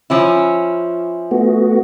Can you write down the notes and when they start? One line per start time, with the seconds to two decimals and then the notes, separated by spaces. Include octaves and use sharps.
0.10 F3 C#4 E4
1.31 A3 B3 F#4